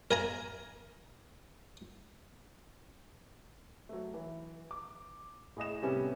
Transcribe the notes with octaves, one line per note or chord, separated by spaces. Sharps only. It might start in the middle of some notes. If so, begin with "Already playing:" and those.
A#4 G#5 A#5
F#3 A3
E3
D6
A2 G#4 D#5 E7
C3 G3 A3 B3 C#4 G4